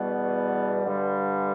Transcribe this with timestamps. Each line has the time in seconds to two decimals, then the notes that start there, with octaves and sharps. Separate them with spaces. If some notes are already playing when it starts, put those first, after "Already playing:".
Already playing: E2 B2 G3 B3
0.85 G2 D3 G3